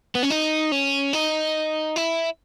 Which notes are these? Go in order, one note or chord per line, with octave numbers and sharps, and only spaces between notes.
B3
C#4
D#4
C#4
D#4
E4